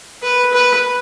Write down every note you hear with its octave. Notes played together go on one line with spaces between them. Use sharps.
B4
B4